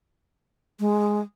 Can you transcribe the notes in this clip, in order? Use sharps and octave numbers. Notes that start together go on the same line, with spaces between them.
G#3